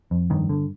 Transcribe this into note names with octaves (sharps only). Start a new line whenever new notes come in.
F2
G2 D#3
D3